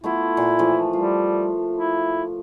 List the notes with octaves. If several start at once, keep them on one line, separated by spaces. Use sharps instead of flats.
A3 B3 E4 F4
A#2
E3 F3 A3
G3 F4
E4